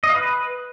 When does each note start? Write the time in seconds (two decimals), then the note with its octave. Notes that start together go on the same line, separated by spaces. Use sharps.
0.04 D#5
0.09 F5
0.15 B4